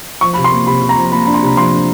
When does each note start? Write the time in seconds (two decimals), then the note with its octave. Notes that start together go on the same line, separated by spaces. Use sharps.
0.21 F3 C#6
0.34 C3 B5
0.44 C6
0.52 A#3
0.67 C3 B5
0.82 C3
0.89 A#5
0.97 F3
1.12 A#3 B5
1.26 D4 B5
1.34 C6
1.42 C3 B5
1.57 F3 C6
1.73 D4